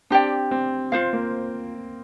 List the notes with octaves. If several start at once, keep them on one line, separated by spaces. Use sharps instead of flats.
C4 D4 G4 D5 G5
C4
C4 F4 C5 F5
A#3